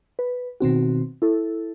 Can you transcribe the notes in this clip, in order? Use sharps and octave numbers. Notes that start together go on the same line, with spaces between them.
B4
B2 D#3 C4 F#4
E4 A4